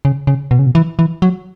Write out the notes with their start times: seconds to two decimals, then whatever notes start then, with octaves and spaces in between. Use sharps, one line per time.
0.05 C#3
0.27 C#3
0.51 B2
0.59 C#3
0.66 B2
0.75 E3
0.99 E3
1.22 F#3